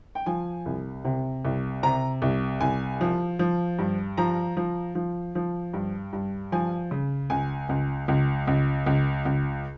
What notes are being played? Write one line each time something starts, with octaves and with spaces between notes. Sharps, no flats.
G5
F3 G#5
C2
C3
C2
C3 A#5
C2
C2 G#5
F3
F3
G2
F3 A#5
F3
F3
F3
G2
G2
F3 G#5
C#3
C#2 G#5
C#2
C#2
C#2
C#2
C#2